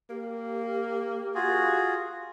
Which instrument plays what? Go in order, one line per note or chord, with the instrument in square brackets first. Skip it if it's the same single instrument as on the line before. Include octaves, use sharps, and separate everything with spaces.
[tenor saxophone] A#3 [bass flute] G4
[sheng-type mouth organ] F4 F#4 G#4